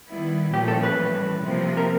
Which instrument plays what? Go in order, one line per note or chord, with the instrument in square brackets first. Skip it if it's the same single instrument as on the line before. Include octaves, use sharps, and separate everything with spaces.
[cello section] D#3 G3 B3 E4
[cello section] A#2 F3 A3 C#4 [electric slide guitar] G4
[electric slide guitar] A4
B4
[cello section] A2 E3 G3
C3 F3 A#3
[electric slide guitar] A#4